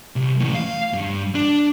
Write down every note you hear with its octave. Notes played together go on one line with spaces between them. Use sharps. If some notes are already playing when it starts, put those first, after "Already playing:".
C2
E2 A2
F5
G2
D4